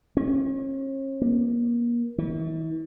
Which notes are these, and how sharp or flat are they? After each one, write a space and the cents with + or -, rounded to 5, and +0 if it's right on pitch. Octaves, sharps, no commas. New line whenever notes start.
C#4 -40
A#3 +30
E3 -45